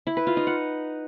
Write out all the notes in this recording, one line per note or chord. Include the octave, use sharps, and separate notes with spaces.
E4
B4
F4
D#4
F#5